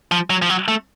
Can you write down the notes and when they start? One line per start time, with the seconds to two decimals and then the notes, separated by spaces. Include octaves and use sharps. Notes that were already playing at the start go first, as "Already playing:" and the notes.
0.12 F3
0.30 F#3
0.42 F3
0.49 F#3
0.68 A3